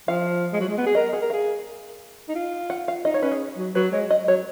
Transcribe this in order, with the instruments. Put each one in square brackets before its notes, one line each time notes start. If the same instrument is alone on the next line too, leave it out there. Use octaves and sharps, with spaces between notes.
[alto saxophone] F3 [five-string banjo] F5
[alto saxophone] G#3
F#3
G#3
B3
G#4
[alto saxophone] A#4 [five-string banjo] D#5
[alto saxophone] G#4 [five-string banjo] F#5
[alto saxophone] A#4
[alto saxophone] G#4 [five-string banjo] F5
[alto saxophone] D#4
F4
[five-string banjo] F#5
F5
[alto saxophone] D#4 [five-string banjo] D#5
[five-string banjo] C#5
[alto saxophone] C#4 [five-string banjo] B4
[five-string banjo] G#4
[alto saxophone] F#3
[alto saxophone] F#3 [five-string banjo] B4
[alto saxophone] G#3 [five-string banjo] C#5
[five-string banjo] D#5
[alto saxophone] F#3 [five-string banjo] C#5